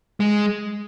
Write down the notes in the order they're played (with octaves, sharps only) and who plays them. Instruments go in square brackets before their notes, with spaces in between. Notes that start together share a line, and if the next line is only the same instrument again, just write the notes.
[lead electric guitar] G#3